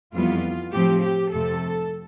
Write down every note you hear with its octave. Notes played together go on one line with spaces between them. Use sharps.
F2 E3 G3 B3 F4
A2 F3 C4 G4
G4
F2 C3 F3 A3 A4